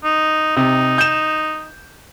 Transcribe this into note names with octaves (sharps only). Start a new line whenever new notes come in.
D#4
C3 D#4
G6 E7